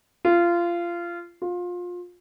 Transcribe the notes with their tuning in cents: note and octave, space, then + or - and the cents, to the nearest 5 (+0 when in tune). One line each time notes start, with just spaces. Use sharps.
F4 -20
F4 +25